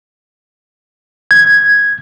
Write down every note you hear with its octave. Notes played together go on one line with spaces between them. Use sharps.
G#6